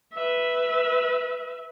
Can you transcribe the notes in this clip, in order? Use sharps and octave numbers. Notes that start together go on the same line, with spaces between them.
B4 E5